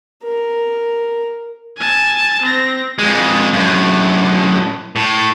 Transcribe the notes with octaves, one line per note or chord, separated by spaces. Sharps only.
A#4
G#5 A5
C4 A#6
F2 G#3
F#2 A2
A2